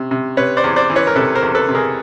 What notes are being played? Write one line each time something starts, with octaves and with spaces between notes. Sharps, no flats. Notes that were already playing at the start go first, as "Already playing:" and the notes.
Already playing: C3
C3
C3 B4 C#5
C5 D5
E2
C5 D5
E3
B4 C#5
A#4
C3 A4 B4
A#4 C5
E2
A4 B4
C3
G#4 A#4